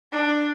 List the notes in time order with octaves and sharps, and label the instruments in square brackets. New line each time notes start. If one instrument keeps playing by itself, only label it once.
[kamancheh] D4